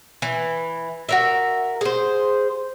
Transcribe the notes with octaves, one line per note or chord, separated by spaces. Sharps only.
E3
F#4 A#4 E5
G#4 C5